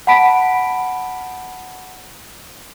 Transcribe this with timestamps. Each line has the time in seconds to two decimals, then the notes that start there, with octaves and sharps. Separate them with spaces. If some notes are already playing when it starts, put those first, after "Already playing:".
0.07 F#5 A5 B5 B6 D7